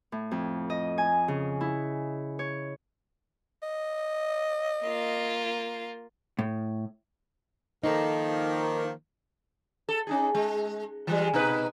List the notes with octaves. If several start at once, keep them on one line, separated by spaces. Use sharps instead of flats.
A2
F2
D#5
G#5
C#3
E4
C#5
D#5
A#3 F4
A2
D#3 F3 A#3 D#4 A4
A4
C#4 D#4 G#4
G#3
E3 G3 G#3
B2 D#4 B4